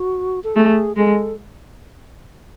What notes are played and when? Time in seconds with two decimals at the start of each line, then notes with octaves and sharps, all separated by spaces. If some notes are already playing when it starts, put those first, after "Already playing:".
Already playing: F#4
0.44 A4
0.55 A3 G#4
0.97 G#3 A4